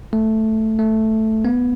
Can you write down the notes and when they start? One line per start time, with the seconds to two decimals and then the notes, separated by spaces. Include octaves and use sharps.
0.13 A3
0.79 A3
1.45 B3